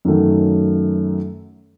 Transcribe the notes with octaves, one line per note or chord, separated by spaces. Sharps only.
F#2 D#3 F#3 A3